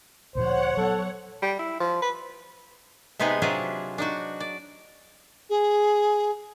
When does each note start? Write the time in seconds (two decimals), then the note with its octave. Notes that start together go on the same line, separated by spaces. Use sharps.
0.35 D2 A#2 F3 C5 C#5 F#5
0.77 F#3 A3 B3 A4
1.42 G3
1.59 E4
1.80 F3
2.02 B4
3.19 C3 G#3 B3 D#4 G#4 F#5
3.42 C3 F#3 D4 F4 G#4 B4
3.98 D4 D#4 F#4
4.40 D5
5.49 G#4